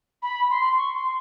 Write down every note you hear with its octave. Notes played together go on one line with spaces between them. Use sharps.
B5
C6
C#6
C6